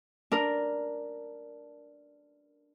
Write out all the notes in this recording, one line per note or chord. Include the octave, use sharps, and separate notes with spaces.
D4 A#4